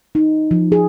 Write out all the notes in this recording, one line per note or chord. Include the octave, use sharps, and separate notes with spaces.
D#4
F3
G#4